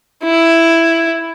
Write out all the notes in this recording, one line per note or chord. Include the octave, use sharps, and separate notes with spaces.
E4